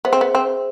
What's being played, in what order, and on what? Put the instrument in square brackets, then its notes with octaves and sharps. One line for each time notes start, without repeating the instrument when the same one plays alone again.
[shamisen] B3 [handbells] G#4 C5 E5
[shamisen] C4
B3
C4